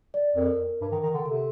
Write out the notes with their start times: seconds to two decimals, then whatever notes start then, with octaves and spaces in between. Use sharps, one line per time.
0.14 D5
0.36 F2 A#4
0.81 G2
0.92 D#3
1.03 D#3
1.14 D3
1.25 C3 A4